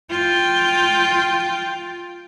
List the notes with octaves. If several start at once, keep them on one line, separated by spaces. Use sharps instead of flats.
F4 G5